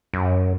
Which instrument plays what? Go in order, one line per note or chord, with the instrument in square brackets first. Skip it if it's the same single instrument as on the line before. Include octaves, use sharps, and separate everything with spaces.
[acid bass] F#2